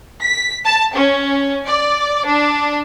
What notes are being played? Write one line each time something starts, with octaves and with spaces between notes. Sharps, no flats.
B6
A5
C#4
D5
D4